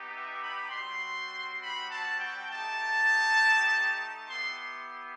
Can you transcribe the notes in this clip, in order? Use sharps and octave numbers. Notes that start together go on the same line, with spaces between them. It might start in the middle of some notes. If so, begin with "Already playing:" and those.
Already playing: B3 D#4 G4
E5
B5
G3 C4 F#4 C6
B5
A5
G5
A3 D#4 G4 A5
B3 E4 G4 C6